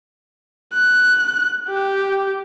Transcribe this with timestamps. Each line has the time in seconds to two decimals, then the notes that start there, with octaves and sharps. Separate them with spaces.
0.74 F#6
1.69 G4